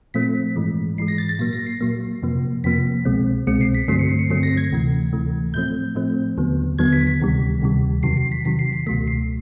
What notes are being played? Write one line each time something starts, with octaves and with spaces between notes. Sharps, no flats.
A#2 F3 A3 C4 B6
G#2 E3 G#3
G#2 E3 G#3 C7
A#6
A6
A6
A#2 F#3 A#3 A#6
A#6
C7
A#2 F#3 A#3
F2 C3 F3 A#3
F2 C3 F3 A#3 B6
C2 B2 G#3 C4
C2 B2 G#3 C4 C#7
C7
B6
G2 D3 F#3 A3 C4 C7
C#7
C7
C#7
G2 D3 F#3 A3 C4 C7
A#6
G#6
D2 C3 E3 A3
D2 C3 E3 A3
A2 F3 A3 C4 G6
A2 F3 A3 C4
D#2 D3 F#3 B3
D#2 D3 F#3 B3 G#6
B6
B6
D2 C3 D#3 G3
D2 C3 D#3 G3
E2 C3 D#3 F#3 C7
C7
B6
E2 C3 D#3 F#3 B6
C7
C7
C#2 B2 F#3 A3 B6
C7